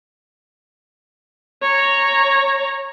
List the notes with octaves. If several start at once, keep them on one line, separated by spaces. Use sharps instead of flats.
C#5 A#5